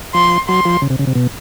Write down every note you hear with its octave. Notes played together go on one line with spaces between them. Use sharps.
F3 C6
F#3 C6
F3
C#3
C3
C#3
C3
B2